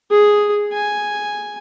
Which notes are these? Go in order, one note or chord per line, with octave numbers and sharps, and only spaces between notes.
G#4
G#5